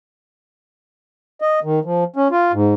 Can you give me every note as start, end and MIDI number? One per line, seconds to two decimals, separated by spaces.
1.41 1.60 75
1.64 1.79 51
1.85 2.04 53
2.16 2.28 61
2.31 2.52 65
2.53 2.74 44